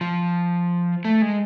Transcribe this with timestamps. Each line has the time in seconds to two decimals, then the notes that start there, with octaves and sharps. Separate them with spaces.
0.01 F3
1.05 A3
1.22 G#3